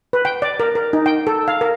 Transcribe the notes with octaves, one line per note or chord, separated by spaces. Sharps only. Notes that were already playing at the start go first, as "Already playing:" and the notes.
B4
G5
D5
A#4
A#4
D#4
G5
A4
F5
A#4